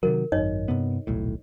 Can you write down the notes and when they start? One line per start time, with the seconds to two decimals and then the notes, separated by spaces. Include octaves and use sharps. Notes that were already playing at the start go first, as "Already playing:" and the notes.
0.03 C3 D#3 F#3 A#4
0.32 G#1 F#2 D#4 C#5 D#5
0.68 G2 C3 B3
1.07 D#1 B1 A2